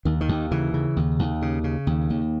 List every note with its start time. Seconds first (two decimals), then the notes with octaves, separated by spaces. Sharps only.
0.05 D#2 D#3
0.21 D#3
0.29 D#2
0.51 C#3 E3
0.74 C#3
0.96 D#2
1.19 D#2
1.42 C#3
1.64 C#3
1.87 D#2
2.10 D#2